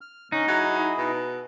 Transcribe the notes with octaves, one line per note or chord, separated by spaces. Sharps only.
F6
D3 C#4 D#4 F#6
F#3 E4 G#4
B2